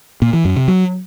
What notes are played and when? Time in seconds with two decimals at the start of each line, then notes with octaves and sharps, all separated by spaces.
0.22 A#2
0.33 E3
0.45 F#2
0.56 C3
0.68 F#3